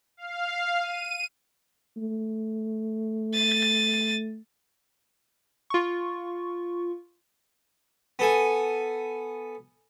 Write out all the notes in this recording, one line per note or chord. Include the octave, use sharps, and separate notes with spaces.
F5
D#7
A3
A6 D#7
F4 C#6
B3 A4 G#5